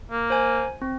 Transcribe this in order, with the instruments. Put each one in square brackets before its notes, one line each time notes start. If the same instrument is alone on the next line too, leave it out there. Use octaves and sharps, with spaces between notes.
[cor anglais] A#3
[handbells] C5 G#5
C4